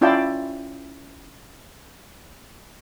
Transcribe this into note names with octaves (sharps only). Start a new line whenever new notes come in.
C#4 E4 F4 D5 G5 A5